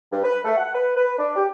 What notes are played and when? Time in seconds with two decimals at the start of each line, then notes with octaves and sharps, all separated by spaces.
0.11 G2
0.23 B4
0.45 A3
0.57 F#5
0.74 B4
0.96 B4
1.18 D4
1.36 G4